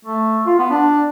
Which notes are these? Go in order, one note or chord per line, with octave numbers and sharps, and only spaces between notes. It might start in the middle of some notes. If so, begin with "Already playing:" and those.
A3
F4
B3
D4